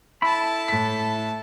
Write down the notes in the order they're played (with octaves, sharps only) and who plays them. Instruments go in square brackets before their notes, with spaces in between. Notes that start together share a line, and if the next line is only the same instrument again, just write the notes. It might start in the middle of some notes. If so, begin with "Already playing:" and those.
[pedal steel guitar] E4 B5 [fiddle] A4 A5
[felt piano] A2 B6